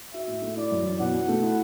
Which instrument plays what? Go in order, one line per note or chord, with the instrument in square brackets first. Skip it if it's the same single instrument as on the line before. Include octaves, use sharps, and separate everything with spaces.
[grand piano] F#4 [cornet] E5
[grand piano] A2
A3
[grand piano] E4 [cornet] D5
[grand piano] F#2
E3
[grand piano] B2 [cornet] F#5
[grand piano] B2
A3
E4